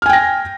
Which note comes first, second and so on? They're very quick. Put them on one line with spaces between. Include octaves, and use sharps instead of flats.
F6 G#5 G5 A#6